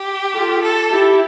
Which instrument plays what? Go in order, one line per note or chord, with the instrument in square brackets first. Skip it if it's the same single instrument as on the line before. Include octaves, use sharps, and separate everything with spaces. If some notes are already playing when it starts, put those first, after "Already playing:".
Already playing: [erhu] G4
[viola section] F4 A4
[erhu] A4
[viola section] E4 G4